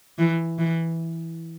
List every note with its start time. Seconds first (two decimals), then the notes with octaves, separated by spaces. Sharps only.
0.18 E3
0.59 E3